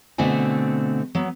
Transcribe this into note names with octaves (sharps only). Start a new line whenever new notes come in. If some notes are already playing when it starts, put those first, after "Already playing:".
B2 D3 A3 C4 G#5
F#3 B3